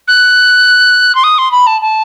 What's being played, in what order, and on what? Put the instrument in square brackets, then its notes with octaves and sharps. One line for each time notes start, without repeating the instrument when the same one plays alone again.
[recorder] F#6
C6
D#6
C6
B5
A5
A5